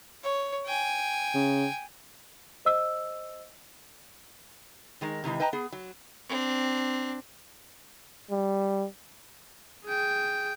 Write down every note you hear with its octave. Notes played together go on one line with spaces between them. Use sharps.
C#5
G5 G#5
C#3
C5 D#5 E6
D#3 G#3 A#4
C3 D#3 E3 G#3
B4 D#5 G5 A5 A#5
B3 G#4
F#3
C4 D4
G3
G#4 G5